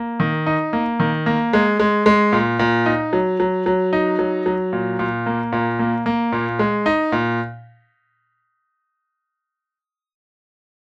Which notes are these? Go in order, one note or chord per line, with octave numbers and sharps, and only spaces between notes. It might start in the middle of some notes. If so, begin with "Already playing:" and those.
Already playing: A#3
D#3
D#4
A#3
D#3
A#3
G#3
G#3
G#3
A#2
A#2
D#4
F#3
F#3
F#3
D#4
F#3
F#3
A#2
A#2
A#3
A#2
A#3
A#3
A#2
G#3
D#4
A#2